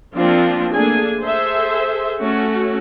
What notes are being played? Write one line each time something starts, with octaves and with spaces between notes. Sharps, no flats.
F3 A#3 C4 D4 F4
A3 A#3 D4 G#4 G#5
G#4 A4 C5 E5
A3 C#4 F#4